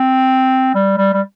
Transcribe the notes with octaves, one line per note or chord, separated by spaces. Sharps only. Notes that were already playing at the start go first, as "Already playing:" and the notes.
Already playing: C4
G3
G3
G3